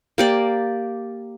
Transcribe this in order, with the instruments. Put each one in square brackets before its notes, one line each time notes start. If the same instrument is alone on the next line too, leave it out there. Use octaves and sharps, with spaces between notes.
[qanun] A#3 G4 D5